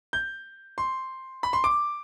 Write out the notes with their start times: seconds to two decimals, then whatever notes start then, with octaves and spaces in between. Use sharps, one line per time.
0.13 G6
0.78 C6
1.43 B5
1.53 C6
1.64 D6